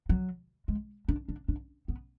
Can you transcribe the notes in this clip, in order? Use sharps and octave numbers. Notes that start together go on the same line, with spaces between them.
F#3
G#3
D4
D4
D4
B3